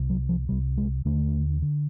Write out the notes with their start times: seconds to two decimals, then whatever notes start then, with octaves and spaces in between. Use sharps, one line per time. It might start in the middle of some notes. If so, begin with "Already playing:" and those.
Already playing: C2 C3
0.10 F#3
0.29 F3
0.49 C2 C3 G3
0.77 G#3
1.05 D#2 D3 A3
1.62 D3